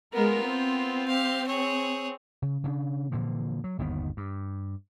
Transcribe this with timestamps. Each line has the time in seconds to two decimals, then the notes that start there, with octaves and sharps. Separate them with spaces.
0.13 G#3 B3 F4 A#4
0.43 C4
1.08 G4 F5
1.48 G#4 C#5
2.42 C#3
2.64 C#3 C#4 D4
3.12 A#2 D3 E3 F3
3.64 F#3
3.78 G1 D#2 D#3 B3
4.17 G2